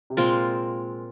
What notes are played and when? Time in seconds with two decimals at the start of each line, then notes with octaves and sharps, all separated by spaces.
0.10 C3
0.17 A#2 G#3 C4 F4 A#4